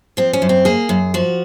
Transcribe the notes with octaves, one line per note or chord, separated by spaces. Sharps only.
F3 C4
C#4
F#2
C4
A#3 G#4
F#2
F3 F#4